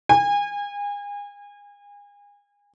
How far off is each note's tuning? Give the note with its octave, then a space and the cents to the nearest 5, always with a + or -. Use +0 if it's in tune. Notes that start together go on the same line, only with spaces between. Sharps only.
G#5 -35